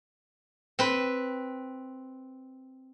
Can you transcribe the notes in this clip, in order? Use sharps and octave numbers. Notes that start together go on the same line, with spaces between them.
C4 B4